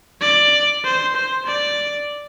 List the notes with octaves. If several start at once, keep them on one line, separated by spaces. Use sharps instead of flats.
D5
C5
C5
D5